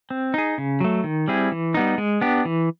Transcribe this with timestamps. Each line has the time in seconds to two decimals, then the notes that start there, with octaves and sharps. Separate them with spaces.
0.10 C4
0.34 D#4 G#4
0.58 C#3
0.80 F#3 A3
1.04 D#3
1.28 G3 C4 E4 G#4
1.52 E3
1.74 G3 B3 D#4
1.98 G#3
2.21 B3 D4 G4
2.45 E3